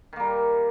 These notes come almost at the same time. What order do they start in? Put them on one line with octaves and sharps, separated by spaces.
D#3 A#3 G3